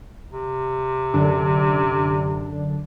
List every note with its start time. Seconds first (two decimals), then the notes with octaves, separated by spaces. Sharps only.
0.33 C3
1.14 F#2 D3 D4